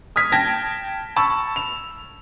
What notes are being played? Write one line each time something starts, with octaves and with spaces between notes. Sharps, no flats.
D#6 F6 G#6 B6
G5 A5 G#6 A#6
A5 B5 C#6 E6
F7